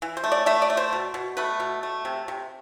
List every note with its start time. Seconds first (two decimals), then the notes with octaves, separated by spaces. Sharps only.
0.02 E3
0.17 C5
0.24 A3
0.32 D5
0.46 A3 E5
0.62 D5
0.70 A3
0.77 C5
0.93 B2
1.14 B2
1.37 A3 B4
1.60 B2
1.83 A3
2.05 C3
2.28 C3